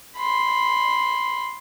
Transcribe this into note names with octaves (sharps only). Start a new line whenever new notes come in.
B5 C6